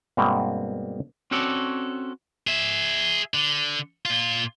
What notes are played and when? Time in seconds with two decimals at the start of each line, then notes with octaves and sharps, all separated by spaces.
0.17 G2 B2 G#3 A#3 C4
1.31 C4 C#4 F#4 A4 C#5 D5
2.47 G#4 E5
3.34 D3
4.05 A#2 F4